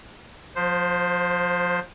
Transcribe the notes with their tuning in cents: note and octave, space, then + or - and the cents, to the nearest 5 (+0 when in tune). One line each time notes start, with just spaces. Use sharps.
F3 +30 C5 +0